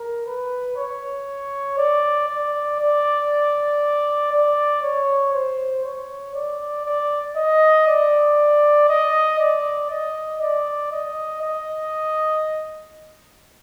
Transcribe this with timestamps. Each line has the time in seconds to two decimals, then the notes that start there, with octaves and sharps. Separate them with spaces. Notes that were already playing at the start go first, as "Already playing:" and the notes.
Already playing: A#4
0.26 B4
0.77 C#5
1.78 D5
2.29 D5
2.80 D5
4.32 D5
4.83 C#5
5.34 C5
5.85 C#5
6.35 D5
6.86 D5
7.36 D#5
7.88 D5
8.89 D#5
9.39 D5
9.90 D#5
10.41 D5
10.92 D#5
11.42 D#5